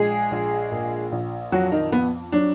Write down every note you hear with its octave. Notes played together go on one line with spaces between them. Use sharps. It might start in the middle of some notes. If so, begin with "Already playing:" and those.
Already playing: A#1 G#3 G#4
A#1
A#2
A#1
F2 F#3 F#4
D#3 D#4
F2 B3
F#3 D4